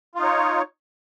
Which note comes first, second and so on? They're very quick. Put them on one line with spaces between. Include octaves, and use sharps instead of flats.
F4 D#4 C#5